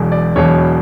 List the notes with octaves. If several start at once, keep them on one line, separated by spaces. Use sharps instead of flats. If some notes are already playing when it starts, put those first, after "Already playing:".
Already playing: E1 E2 B2 F#3
D5
E1 E2 B2 F#3 C#5